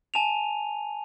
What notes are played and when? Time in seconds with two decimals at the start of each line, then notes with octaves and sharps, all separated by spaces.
0.14 G#5 A5 D#7 F7